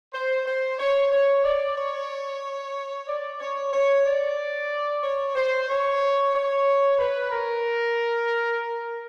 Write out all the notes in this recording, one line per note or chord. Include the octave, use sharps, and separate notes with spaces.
C5
C5
C#5
C#5
D5
C#5
D5
C#5
C#5
D5
C#5
C5
C#5
C#5
B4
A#4